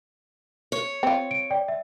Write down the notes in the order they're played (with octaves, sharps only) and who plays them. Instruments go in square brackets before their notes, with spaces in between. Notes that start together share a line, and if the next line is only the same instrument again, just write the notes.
[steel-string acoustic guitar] C#5
[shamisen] C4 F4
[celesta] D7
D5 G5
E5